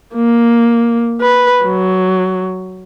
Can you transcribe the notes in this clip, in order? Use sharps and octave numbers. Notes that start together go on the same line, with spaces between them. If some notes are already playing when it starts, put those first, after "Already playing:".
A#3
B4
F#3